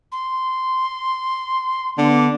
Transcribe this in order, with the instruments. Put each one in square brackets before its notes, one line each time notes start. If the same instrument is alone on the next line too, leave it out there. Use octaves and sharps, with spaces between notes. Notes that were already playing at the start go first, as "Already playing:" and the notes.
[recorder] C6
[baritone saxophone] D3 [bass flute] B3 [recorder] D6